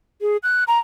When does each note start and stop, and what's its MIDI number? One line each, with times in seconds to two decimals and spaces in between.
0.21 0.37 68
0.43 0.64 90
0.68 0.79 82